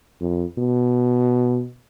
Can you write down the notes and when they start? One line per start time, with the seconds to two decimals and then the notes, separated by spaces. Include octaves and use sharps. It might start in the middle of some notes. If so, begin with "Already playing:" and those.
0.21 F2
0.59 B2